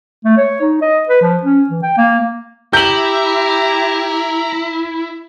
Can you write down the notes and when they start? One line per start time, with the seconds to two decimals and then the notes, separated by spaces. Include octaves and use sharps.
0.25 A3
0.37 C#5
0.61 D#4
0.82 D#5
1.09 B4
1.22 F3
1.43 C#4
1.69 E3
1.83 G5
1.98 A#3
2.73 E4 G4 A#5 G6 F#7